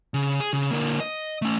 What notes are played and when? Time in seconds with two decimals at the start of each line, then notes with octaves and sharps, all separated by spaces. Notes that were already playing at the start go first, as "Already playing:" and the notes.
0.14 C#3
0.40 G#4
0.53 C#3
0.71 D3 A#3
1.00 D#5
1.42 A3 C#4